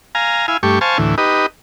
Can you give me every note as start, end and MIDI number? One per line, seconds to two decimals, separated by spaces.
0.15 0.46 77
0.15 0.46 80
0.15 0.46 82
0.48 0.57 64
0.48 0.57 77
0.48 0.57 80
0.63 0.79 43
0.63 0.79 57
0.63 0.79 67
0.63 0.79 85
0.81 0.98 72
0.81 0.98 77
0.81 0.98 80
0.81 0.98 81
0.81 0.98 85
0.98 1.15 38
0.98 1.15 45
0.98 1.15 52
1.18 1.46 63
1.18 1.46 67
1.18 1.46 71
1.18 1.46 75